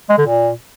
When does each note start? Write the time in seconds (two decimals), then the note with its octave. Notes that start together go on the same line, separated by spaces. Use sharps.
0.10 G#3
0.18 D3
0.27 A#2